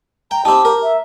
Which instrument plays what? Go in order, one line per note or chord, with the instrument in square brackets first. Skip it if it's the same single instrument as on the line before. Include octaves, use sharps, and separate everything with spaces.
[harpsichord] G5 [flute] A#5
[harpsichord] C4 D#4 [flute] G4 [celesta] A5
[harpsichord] A#4 [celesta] A#5
[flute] E5